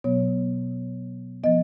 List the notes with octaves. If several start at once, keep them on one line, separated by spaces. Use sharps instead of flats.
B2 F#3 B3 C#5
F3 B3 D#5